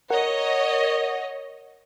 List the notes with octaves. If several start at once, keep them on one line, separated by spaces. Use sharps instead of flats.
A#4 C#5 D#5 F#5